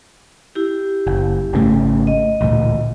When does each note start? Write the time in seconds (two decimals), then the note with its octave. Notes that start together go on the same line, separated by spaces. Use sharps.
0.55 E4 G4
1.07 F#1
1.53 G#1 C#3 A3
2.07 D#5
2.41 A1 D2 A#2